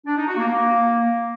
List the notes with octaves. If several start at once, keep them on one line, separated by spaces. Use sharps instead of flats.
D4
D#4
F#4
A#3
A#3